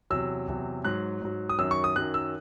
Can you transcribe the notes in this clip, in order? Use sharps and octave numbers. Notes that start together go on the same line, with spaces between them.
E2 C3 F#3 E6
E2 C3 F#3
G#2 F#3 F#6
G#2 F#3
D#6
F#2 D#3 F#3 E6
C#6
D#6
F#2 D#3 F#3 F#6
E6